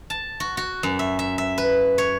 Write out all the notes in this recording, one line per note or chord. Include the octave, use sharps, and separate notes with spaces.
A5
F#4
F#4
F#2
E5
E5
E5
B4
C#5